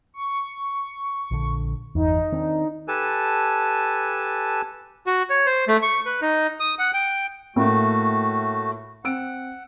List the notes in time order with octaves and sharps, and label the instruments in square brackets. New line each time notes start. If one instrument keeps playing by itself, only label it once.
[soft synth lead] C#6
[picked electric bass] A#1 D3
[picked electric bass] G1 E2 [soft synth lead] D#4
[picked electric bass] D#3 C4 D4
[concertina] G4 A4 B4 G#5 A5
F#4
C#5
C5
A3
C#6
B4
D#4
D#6
F#5
G5
[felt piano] A2 A#3 [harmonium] A3 F#4
[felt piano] C4 E6 D7 [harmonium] F#5